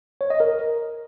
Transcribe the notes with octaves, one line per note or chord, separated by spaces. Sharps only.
C#5
D#5
A#4